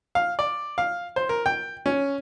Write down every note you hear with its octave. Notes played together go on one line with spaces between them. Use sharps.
F5
D5
F5
C5
A#4
G5
C#4